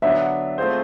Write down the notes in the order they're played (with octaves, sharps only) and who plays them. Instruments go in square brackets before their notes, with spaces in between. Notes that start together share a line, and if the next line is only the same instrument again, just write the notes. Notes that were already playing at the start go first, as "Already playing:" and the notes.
[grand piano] D3 F#3 B3 D4 [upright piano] E5
[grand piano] A3 C4 F4 G#4 C5